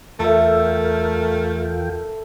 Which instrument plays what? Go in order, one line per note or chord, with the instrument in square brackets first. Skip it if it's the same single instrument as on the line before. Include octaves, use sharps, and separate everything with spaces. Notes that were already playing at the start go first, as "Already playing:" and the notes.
[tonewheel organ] E2 F4 G5 [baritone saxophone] A3 [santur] A4 E5 [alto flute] A#4